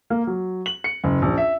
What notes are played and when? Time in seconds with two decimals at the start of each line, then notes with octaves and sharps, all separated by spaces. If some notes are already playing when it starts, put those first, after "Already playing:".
0.10 A#3
0.27 F#3
0.66 F#7
0.84 C#7
1.04 F#1
1.22 A#1
1.38 E5